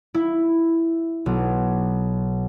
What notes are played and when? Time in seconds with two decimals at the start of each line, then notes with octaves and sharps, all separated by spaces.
0.14 E4
1.26 B1